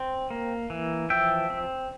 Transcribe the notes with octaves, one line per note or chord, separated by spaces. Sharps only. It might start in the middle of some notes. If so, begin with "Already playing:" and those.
Already playing: C4
A#3
E3
F3 E5 G5
C4